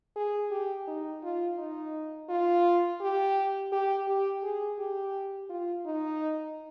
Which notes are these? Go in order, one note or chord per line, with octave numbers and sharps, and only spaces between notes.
G#4
G4
D#4
F4
D#4
F4
G4
G4
G4
G#4
G4
F4
D#4